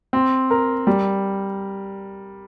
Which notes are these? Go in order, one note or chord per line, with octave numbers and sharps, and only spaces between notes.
C4
A#4
G3